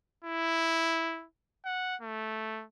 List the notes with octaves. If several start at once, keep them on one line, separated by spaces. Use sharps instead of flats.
E4
F#5
A3